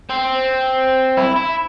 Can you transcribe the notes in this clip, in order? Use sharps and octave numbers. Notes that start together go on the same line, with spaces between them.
C4
E4
E4